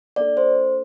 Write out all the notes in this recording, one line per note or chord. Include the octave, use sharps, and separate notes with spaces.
A#3 D4 A4 D5
C5